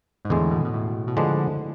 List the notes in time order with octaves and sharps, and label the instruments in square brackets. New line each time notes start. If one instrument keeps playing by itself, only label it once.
[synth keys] G#2
[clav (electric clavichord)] E2 D3 G#3 [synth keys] A2
[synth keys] B2
B2
A2
B2
[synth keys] A2 [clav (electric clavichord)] D3 F3 G#3 B3 D4